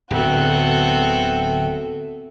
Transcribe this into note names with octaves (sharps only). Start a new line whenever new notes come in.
D1 D3 B3 C4 F#4 A4 E5 G5